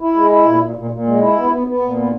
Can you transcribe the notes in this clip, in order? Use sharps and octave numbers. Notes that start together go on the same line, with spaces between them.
E4
G#3
E4
A#2
A#2
A#2
A#2
G#3
E4
B3
B3
B3
A#2
B3